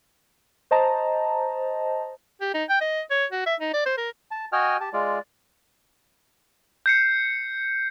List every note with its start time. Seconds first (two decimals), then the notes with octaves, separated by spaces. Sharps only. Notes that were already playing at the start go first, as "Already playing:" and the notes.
0.71 C5 D#5 A5 A#5
2.41 G4
2.54 D#4
2.70 G5
2.81 D#5
3.11 C#5
3.32 F#4
3.46 E5
3.60 D#4
3.73 D5
3.86 C5
3.98 A#4
4.31 A5
4.53 F#4 D#5 G5 G#5 F6
4.81 G4 A5
4.93 G#3 F4 D5
6.86 G6 C7 C#7